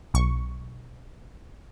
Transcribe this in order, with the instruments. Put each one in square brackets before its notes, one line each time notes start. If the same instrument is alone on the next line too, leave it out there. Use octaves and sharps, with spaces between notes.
[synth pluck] B1 C#6